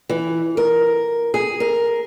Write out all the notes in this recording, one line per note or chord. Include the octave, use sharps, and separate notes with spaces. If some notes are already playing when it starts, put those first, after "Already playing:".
E3
A#4
G#4
A#4